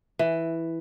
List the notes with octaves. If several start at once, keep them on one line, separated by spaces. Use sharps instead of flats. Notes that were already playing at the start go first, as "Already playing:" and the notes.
E3